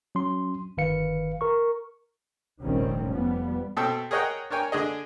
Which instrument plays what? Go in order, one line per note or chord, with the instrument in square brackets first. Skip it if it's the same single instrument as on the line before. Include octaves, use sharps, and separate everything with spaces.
[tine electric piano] F#3 C#4 C6
G1 D#3 B4 F5 C#7
A#4 C#6
[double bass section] F1 A#1 D#3 G3 C4 C#4
F2 F3 G3 B3
[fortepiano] B2 C4 A4 G5 E6
G#4 A#4 C#5 D#5 F#5 G5
D4 A#4 C#5 G5 G#5
D3 D4 G#4 D#5